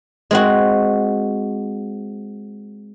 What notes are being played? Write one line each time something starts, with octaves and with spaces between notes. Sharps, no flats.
G#3 C4 F#4